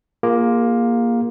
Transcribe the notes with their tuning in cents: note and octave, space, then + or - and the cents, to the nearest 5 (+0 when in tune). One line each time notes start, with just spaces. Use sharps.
A#3 +10 F4 +0 G#4 -20